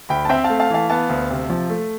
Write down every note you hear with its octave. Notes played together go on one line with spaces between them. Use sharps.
D2 G5 B5
A5
C4 E5 G5
F5 A5
A3
F5 A5
E3 F5 A5
B3 F5 A5
D2
C3
F3
A3